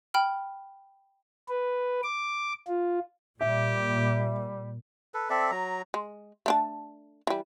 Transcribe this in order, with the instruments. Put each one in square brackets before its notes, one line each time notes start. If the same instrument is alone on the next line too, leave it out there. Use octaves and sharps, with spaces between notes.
[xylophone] G5 B5 F6
[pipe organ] B4
D6
F4
[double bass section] A#2 [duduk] G3 [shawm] G4 [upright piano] E5
[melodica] A4 B4
C4 A4 D5 E5
F#3 A#5
[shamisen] G#3
A3 D4 A5
E3 G3